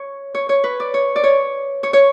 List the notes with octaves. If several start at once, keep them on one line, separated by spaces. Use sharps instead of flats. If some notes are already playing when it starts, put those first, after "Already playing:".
Already playing: C#5
C#5
C#5
B4
D5
C#5
D5
C#5
C#5
C#5